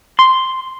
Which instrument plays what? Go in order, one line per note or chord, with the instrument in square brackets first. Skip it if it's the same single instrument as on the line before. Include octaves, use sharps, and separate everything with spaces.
[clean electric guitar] C6